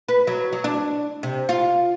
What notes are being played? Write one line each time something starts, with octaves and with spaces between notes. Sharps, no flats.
B4
F#3
F#3
D4
C3
F4